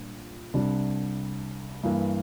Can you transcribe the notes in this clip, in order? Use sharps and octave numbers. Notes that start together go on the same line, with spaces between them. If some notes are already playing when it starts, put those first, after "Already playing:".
Already playing: A#2 G3 D4
C2 C3 G3 D4
G2 E3 A#3